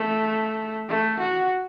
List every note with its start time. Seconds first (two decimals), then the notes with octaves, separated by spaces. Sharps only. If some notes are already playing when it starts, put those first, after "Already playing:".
Already playing: A3
0.89 A3
1.20 F#4